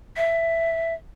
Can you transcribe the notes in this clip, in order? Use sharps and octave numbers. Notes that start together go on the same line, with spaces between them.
E5